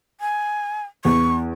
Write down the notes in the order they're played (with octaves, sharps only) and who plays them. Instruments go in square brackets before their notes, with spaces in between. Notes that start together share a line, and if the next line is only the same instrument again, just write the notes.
[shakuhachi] G#5
[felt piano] E2 [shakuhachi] C#6